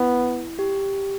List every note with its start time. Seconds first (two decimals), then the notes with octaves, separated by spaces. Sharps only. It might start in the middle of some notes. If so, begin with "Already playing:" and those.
Already playing: B3 E4
0.59 G4